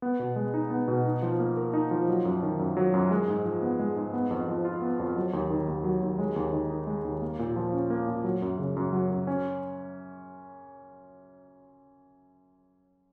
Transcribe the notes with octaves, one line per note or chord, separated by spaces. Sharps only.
B3
B2
G#3
D#4
B3
B2
D#4
F3
A#3
A#4
D#4
F3
F#3
F#2
D#3
F#2
F#3
F#2
G#3
G#2
F3
B3
G#3
G#2
B3
F2
F3
F4
B3
F2
F#3
D#2
D#3
D#2
F#3
D#2
G#3
D#2
D#3
D#4
G#3
D#2
A#3
A#2
F3
C#4
A#3
A#2
F#3
F#2
C#3
F#2
F#3
F#2
C#4